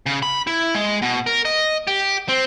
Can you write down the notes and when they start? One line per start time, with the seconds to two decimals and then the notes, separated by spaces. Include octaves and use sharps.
0.06 C#3
0.23 B5
0.47 E4
0.74 G#3
1.02 B2
1.27 A#4
1.45 D#5
1.87 G4
2.29 C4